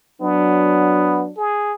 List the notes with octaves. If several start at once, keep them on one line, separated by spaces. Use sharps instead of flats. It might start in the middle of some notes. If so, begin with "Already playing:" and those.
F#3 B3 D4
G#4